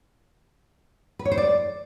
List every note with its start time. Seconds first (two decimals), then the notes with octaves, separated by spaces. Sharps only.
1.19 B4
1.25 C#5
1.32 C5
1.38 D5